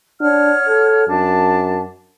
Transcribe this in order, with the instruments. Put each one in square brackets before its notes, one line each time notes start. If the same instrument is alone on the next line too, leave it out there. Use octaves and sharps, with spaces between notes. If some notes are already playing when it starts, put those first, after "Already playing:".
[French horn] D4 [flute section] C#5 F#5 F6
[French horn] A4
[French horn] F#2 [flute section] D4 A5